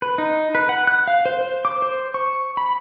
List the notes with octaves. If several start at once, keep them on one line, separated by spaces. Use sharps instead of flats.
B4
D#4
B4
F#5
F#6
F5
C5
C5
D6
C5
C#6
B5